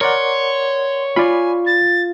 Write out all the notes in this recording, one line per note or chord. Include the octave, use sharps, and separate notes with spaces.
A#4 C#5 D5 F#5 C6
F4 D5 G#5 B5
A6